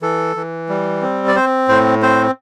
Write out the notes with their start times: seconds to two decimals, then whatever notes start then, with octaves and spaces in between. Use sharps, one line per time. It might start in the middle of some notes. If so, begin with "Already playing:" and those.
0.02 E3 A4
0.36 E3
0.69 G3
1.02 C4
1.28 D5
1.35 C4 C5
1.69 A2 C5
2.02 C4 C5